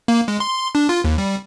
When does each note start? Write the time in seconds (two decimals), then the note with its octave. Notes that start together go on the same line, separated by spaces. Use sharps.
0.08 A#3
0.28 G#3
0.40 C6
0.75 D4
0.89 F4
1.04 D#2
1.18 G3